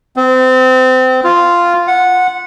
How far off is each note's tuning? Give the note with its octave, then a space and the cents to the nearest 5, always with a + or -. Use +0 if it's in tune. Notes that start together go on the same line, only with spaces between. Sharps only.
C4 -25
F4 -5
F#5 -15